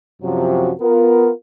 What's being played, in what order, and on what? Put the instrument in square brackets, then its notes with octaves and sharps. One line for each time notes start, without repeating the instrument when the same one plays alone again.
[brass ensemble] F#2 C3 F3 F#3
B3 F4 A#4